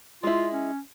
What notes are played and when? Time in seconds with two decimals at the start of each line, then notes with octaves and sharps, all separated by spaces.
0.23 G#3 E4 F4
0.53 C#4